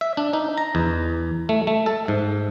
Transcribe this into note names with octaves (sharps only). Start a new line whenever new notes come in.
E5
D4
D#4
A#5
E2
A3
A3
A4
G#2